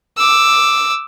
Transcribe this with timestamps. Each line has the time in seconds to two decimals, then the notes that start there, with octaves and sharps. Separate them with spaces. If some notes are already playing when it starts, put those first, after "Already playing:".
0.17 D6 E6